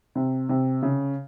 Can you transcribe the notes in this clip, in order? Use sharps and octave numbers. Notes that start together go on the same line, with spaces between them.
C3
C3
C#3